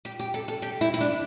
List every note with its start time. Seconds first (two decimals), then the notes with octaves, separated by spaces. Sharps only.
0.05 G4
0.19 G4
0.34 A4
0.48 A4
0.62 G4
0.81 E4
0.94 E4
1.01 D4